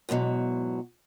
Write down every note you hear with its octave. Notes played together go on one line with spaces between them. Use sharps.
E2 G#2 B2 F#3